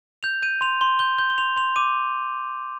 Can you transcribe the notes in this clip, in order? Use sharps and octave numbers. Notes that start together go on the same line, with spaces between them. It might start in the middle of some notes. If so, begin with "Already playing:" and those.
G6 F7
G6 D#7
C6 F7
C6 G7
G6 G7
G6 G7
G7
C6 F7
C6 F7
D6 D#7